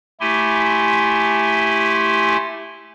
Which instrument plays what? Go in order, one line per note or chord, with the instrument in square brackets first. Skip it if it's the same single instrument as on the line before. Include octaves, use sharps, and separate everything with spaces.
[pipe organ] A3 E4 G4 G#5 C6